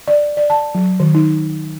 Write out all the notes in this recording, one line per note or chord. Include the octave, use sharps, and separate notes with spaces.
D5
D5
A5
F#3
D#3
D#4